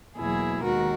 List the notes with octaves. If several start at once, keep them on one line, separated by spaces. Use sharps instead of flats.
E2 B2 F#3 A#3 E4 G#4
D#2 D#3 G#3 F#4 A#4